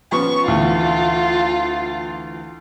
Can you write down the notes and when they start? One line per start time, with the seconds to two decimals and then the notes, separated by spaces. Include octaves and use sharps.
0.12 F3 B3 C#4 C#6
0.47 D2 E3 F4